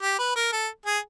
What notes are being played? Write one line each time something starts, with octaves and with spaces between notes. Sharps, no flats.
G4
B4
A#4
A4
G#4